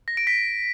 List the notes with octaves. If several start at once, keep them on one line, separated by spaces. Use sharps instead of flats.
A#6
D7
B6